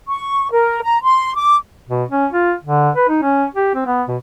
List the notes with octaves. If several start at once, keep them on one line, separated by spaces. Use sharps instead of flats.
C#6
A#4
A#5
C6
D6
B2
C#4
F4
D3
B4
D#4
C#4
G4
C4
B3
B2